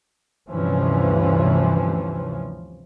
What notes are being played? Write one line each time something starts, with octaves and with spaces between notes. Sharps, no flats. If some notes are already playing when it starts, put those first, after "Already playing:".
D2 G2 C3 E3 F3 C#4